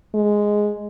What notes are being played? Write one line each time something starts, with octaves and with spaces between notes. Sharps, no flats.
G#3